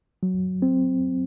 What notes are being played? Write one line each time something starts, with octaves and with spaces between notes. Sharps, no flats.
F#3
C4